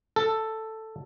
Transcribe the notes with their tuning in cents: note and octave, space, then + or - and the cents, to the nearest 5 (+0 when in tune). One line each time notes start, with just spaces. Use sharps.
A4 +5